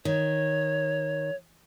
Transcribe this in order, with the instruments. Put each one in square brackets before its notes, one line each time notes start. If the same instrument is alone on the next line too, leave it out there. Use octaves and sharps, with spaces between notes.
[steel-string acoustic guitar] D#3 [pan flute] C#5